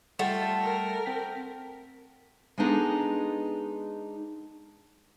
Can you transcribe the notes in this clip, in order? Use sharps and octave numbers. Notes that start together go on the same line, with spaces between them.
G3 A3 F4 F#5 G5
A#4
C4 G5 B6
G#3 B3 D4 D#4 G#4 A4